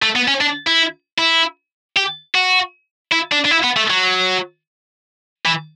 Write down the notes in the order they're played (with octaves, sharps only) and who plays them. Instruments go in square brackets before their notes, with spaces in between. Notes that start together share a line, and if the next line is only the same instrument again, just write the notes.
[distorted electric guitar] A3
B3
C#4
D4
E4
E4
G4
F#4
E4
D4
D4
E4
B3
A3
F#3
E3